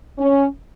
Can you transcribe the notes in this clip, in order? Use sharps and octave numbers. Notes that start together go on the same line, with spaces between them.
C#4